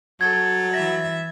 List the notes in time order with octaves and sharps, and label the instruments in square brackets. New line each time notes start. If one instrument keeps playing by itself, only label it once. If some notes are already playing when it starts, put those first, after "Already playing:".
[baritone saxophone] F#3 [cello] A4 [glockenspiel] G#6
[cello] E3 E5 [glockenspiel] A6 A#6